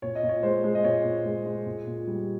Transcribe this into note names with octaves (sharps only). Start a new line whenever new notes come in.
A#2 C#5
D#5
A#2
C#5
G#3 C5
G#3
D#5
A#2 C#5
A#2
G#3
G#3
A#2
A#2
G3